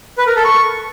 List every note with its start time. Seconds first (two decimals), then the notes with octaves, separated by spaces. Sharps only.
0.18 B4
0.27 A#4
0.36 A4
0.45 C#6